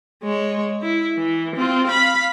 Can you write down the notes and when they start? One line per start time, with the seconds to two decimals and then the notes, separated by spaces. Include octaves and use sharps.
0.23 G#3 C#5
0.82 E4
1.18 E3
1.56 C4 F4
1.87 F5 B5